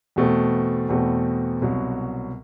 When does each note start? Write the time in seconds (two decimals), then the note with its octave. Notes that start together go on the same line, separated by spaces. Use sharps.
0.16 E2 B2 A3 C4
0.89 E2 B2 A3 C4
1.62 C2 B2 F#3